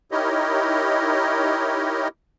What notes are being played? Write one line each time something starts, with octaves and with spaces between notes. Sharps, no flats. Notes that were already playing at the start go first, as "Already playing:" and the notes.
D#4 E4 G4 A#4 C#5 D#5